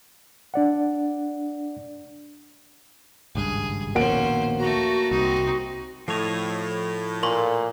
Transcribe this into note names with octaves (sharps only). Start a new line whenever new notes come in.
D4 D5 F#5
G#1 C#2 G2 G#4
A#1 D#2 B2 A#3 C#4 C5 F#5 D7
A3 F#4 A#5
C2 C4 D#4
A2 F3 C#5 D#5
A#2 A#4 C6 C#6